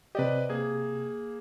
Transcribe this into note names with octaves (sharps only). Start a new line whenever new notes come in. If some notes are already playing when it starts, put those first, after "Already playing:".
C3 G4 B4 D5 D#5
A#3 G#4